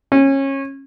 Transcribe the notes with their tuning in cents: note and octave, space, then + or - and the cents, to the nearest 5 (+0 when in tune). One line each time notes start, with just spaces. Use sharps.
C#4 -25